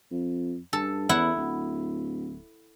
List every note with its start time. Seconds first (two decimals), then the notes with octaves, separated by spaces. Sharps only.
0.11 F2
0.73 G2 A4
1.09 E2 E4 F#5
1.37 D1